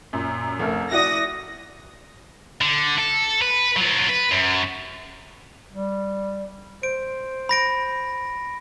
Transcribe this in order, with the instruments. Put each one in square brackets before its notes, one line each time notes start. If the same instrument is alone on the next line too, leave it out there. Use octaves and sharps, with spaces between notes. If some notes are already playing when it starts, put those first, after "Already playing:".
[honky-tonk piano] F#2 A#2
F1 A3 A#4
[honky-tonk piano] E4 F#4 D5 [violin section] D#6 A#6
[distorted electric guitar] D3
A4
B4
F#3 F4
B4
F#2
[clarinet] G3
[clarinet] C5 [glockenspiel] D7
[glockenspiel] B5 A#6 D7